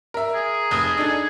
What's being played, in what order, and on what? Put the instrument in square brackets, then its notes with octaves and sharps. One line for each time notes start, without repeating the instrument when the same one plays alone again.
[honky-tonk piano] A#4 E5
[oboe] G#4
[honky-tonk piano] F1 D#6
D4 D#4 A4